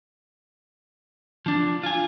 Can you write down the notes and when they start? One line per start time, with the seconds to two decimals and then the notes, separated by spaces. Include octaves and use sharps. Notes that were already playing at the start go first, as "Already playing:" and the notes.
1.46 F3 D4
1.83 F4 G#5